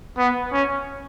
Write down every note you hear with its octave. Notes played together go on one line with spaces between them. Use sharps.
B3
C#4